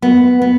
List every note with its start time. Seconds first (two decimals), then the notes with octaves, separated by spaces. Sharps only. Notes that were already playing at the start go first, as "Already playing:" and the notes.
0.02 B3
0.42 B3